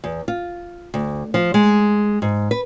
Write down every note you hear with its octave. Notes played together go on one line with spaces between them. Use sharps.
E2
F4
D2
F3
G#3
G#2
B4